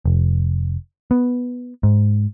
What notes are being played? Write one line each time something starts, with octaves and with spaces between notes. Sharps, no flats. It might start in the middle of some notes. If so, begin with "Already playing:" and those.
F1
B3
G#2